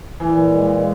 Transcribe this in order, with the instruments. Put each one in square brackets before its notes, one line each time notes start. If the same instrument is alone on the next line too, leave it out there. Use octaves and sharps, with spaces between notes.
[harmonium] A#2 [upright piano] E3
[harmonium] G#3
G#3